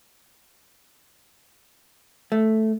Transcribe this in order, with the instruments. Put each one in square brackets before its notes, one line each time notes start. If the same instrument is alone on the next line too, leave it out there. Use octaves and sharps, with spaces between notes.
[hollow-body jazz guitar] A3